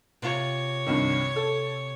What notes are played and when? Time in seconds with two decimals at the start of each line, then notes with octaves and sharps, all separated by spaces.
0.22 C3 F4 C#5
0.86 C2 G2 D#3
1.36 A4